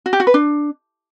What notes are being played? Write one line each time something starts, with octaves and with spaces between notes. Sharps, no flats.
F#4
G4
F#4
B4
D4